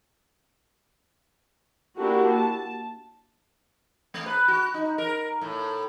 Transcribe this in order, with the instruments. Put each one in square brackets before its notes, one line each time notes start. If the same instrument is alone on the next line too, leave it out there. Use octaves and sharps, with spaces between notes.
[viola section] A#3 D4 E4 F#4 G4 A#4
A5
[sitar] A3
B4
F#4
D#4
A#4
A2